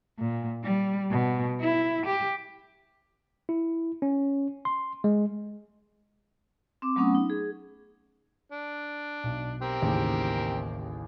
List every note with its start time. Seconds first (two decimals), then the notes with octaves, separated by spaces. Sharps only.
0.19 A#2
0.63 G3
1.11 B2
1.61 E4
2.06 G4
3.49 E4
4.02 C#4
4.65 C6
5.04 G#3
6.82 C4 D6
6.96 F#3 A3 B3 C#4 F#5 D#6
7.15 D#4
7.30 G#4
8.52 D4
9.24 B1
9.62 C4 G4 A#4
9.82 A1 D#2 C#3